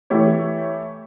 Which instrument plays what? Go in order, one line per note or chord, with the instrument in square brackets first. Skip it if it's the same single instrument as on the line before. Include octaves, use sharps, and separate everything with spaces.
[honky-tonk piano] E3 A3 E4 G4 C#5